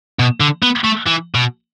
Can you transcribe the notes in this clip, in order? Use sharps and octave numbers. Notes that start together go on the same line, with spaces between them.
B2
D3
B3
A3
E3
B2